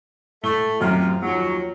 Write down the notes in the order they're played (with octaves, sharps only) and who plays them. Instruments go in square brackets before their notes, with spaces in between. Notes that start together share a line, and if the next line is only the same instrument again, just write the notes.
[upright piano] A2 G7 [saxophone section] A3
[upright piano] F#2 A2 F6 [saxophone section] C3 F4
[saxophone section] D#2 F#3 [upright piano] F3